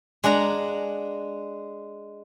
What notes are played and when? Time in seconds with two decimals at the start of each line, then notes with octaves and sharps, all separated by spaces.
0.24 G#3 D4 F#5 A#5